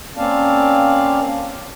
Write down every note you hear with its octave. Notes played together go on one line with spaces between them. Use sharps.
A#3 C4 C#4 D5 F5 A5